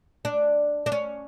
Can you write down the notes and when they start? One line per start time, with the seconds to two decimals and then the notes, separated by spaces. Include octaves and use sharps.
0.25 D4
0.86 D4
0.92 C#4